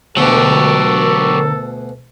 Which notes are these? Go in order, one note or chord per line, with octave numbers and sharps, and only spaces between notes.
D2 B2 D3 F#3 G4 A4 A#4